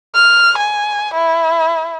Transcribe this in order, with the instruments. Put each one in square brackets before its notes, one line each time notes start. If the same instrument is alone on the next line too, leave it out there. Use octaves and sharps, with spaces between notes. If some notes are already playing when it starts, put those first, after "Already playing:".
[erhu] F6
G#5
E4